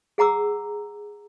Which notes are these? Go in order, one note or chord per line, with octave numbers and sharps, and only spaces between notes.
G#4 F#5 A#5 D6 E6